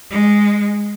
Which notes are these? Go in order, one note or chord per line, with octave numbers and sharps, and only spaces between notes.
G#3